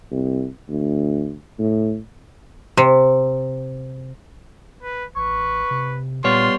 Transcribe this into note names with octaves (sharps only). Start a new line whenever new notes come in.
C2
D2
A2
C3
B4
A1 B4 C#6
C3
A#2 G3 B3 F4 C#5 C6